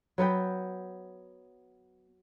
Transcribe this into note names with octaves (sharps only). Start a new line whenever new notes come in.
F#3 B3 B4 G5